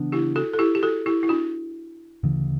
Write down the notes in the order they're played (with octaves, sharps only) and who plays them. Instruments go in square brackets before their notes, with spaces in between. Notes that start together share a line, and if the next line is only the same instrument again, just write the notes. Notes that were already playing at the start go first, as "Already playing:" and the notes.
Already playing: [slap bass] C#3 E3 B3 D4
[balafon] E4 G4
F#4 A4
A4
E4 G4
G4
F#4 A4
E4 G4
E4
D4 F#4
[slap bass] D2 C#3 E3